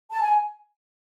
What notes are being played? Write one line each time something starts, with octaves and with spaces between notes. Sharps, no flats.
A5
G#5